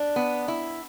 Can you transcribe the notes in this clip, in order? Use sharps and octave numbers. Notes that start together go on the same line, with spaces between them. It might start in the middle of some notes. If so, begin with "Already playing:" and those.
Already playing: D4
B3
E4